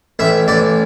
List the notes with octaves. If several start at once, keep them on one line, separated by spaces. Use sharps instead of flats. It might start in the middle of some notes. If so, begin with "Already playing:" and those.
A1 E5
A1 D5